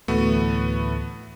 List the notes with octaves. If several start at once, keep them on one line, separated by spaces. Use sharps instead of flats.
D2 A2 E3 A3 B3 F#4